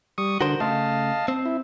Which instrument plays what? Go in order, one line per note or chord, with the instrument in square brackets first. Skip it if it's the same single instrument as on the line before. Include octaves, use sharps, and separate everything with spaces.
[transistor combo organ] G3 C#6 D#6
[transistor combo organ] D3 [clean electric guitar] F#4 A#4 C5
[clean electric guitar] C#3 A3 [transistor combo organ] D#5 F5 A5
[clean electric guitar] C4
[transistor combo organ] E4